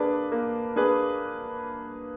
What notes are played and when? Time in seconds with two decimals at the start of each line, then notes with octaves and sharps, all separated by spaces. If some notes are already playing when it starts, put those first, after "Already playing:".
Already playing: A#3 D4 G#4 B4
0.32 A#3
0.76 D4 G#4 B4